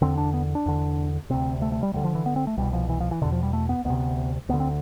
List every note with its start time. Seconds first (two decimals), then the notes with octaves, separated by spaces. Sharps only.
0.02 E2 D3 C4
0.18 D4
0.34 B3
0.55 D4
0.66 E2 D3
1.30 D2 C3 C4
1.62 A3
1.72 A3
1.83 G3
1.93 D2 D3 G3
2.04 F3
2.15 E3
2.26 B3
2.36 C4
2.47 A3
2.57 C2 B2 G3
2.73 F3
2.89 E3
3.00 F3
3.11 E3
3.21 B2 D3
3.25 E2
3.32 F3
3.43 G3
3.53 A3
3.69 B3
3.85 D2 C3 B3
4.49 D2 B3
4.54 D3
4.60 C4